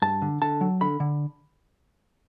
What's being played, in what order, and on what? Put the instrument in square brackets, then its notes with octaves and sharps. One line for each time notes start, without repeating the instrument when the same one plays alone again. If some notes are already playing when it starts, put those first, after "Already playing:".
[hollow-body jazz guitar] G2 A5
D3
D3 A5
F#3
D3 B5
D3